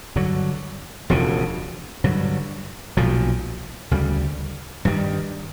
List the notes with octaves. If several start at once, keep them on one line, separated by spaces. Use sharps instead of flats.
G2 D3 F#3
E1 D2 C#3 F3
G2 D3 F#3
B1 A#2 F3
D2 C#3 E3 G3
G2 D#3 G3